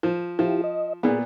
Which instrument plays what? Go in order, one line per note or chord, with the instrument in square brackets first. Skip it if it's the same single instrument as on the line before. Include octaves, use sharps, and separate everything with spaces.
[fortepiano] F3
[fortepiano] F3 [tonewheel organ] E4 F4 G4
[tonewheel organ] D#5
[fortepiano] A#2 B3 [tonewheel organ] G#4